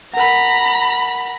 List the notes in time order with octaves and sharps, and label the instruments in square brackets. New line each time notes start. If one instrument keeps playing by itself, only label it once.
[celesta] A#4 F#5 [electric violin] A#5 B5